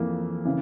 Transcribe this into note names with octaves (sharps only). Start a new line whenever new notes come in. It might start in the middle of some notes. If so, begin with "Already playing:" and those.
Already playing: F2 E3 A#3
C#3 E3